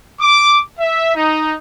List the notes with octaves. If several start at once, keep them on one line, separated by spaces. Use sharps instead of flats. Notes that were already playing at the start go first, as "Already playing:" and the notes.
D6
E5
D#4